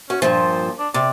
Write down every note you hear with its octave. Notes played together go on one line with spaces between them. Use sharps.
C#4 F#4
G2 A#2 F3 C5
D4
C3 D5